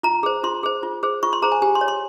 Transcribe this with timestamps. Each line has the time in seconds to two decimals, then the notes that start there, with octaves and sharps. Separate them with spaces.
0.03 F4 A#5
0.23 G#4 C5
0.43 F4 C6
0.63 G#4 C5
0.83 F4
1.03 G#4 C5
1.23 F4 C#6
1.33 C6
1.42 G#4 C5 A#5
1.52 G#5
1.62 G4 G#5
1.75 C6
1.81 C#5
1.88 C6